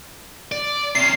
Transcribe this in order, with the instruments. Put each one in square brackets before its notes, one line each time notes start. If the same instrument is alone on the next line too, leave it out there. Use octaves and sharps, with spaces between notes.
[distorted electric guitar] D5
[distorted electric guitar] C3 C#4 [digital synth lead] C7